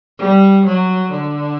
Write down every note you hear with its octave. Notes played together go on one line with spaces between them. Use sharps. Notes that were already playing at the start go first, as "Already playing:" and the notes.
G3
F#3
D3